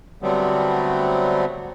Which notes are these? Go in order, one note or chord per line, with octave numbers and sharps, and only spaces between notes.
D3 F#3 G3 A3 B3 C4